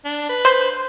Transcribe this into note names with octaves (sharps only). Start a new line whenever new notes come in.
D4
B4
C5 C6 G6